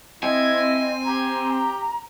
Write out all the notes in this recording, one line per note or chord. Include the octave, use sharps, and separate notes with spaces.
C4 E4 D#5 G#5
G4 A#5